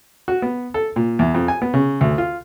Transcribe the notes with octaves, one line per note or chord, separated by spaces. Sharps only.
F#4
B3
A4
A#2
E2
F2
G#5
B3
C#3
D2
F4